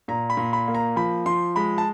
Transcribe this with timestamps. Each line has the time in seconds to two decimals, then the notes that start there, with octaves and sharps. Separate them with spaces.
0.08 A#2 A#5
0.30 B5
0.37 A#2
0.53 B5
0.68 A#3
0.75 A#5
0.96 F3 B5
1.26 F3 C6
1.56 G#3 B5
1.78 A5